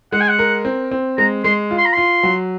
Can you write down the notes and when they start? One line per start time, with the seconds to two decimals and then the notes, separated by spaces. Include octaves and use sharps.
0.12 G#3 F#5
0.21 G#5
0.28 F#5
0.39 A#4
0.65 C4
0.91 C4
1.18 G#3 A#5
1.44 G#3 C6
1.71 F4
1.78 C6
1.86 A#5
1.93 F4 C6
2.23 F#3